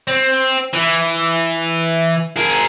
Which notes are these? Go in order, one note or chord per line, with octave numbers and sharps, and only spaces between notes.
C4
E3
G#4 A#4